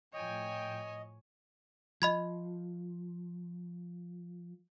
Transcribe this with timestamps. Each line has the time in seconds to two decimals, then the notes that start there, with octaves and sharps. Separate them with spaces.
0.13 A2 F3 C#5 D#5 G5 G#5
2.02 F3 D#5 B5 G#6